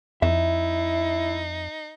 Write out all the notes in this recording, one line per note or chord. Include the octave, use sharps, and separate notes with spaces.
F2 D#4 E4 E5